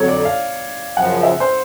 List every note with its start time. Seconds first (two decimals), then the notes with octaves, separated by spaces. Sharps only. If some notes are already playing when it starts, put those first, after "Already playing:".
Already playing: F2 D3 F#3 C#5
0.08 D5
0.25 F5
0.96 F#2 C#3 F3 F#5
1.23 E5
1.40 C5